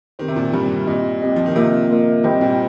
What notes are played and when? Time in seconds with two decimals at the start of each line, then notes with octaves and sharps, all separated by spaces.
0.19 D#3 C4 G4 C5
0.28 C3
0.36 A#2
0.54 G2 C4 G4 C5
0.87 A#2 C4 G4 D#5
1.22 C4 G4 D#5
1.36 F3
1.46 D#3
1.55 C3 A#3 F4 A#4 D#5
1.90 A#3 F4 A#4 D#5
2.23 G2 C4 G4 C5 D#5 G5
2.41 A#2